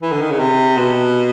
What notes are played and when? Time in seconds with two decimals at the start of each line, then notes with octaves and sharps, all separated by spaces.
0.02 E3
0.12 D3
0.21 D#3
0.30 C#3
0.40 C3
0.77 B2